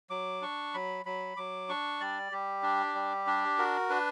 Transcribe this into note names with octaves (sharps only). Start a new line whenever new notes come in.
F#3 D6
D4 C#6
F#3 B5
F#3 B5
F#3 D6
D4 C#6
G3 D5
G3 G4
D4
G3
D4
F#4 A#4
D4 B4